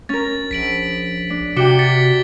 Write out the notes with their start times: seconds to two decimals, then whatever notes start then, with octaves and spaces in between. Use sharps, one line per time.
0.09 C#4 A#4 A6
0.51 A#1 B6 D7 F#7
1.30 D4
1.57 C3 F#4 D5 G5 D6 C#7 G7
1.79 A6 B6 C#7